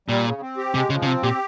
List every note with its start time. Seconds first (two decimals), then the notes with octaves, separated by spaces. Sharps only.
0.08 A#2 G3
0.24 C#3
0.41 C4
0.57 G4
0.73 C3 G#3
0.90 C#3 F3
1.02 C#3
1.06 C3 C4
1.23 A#2 G4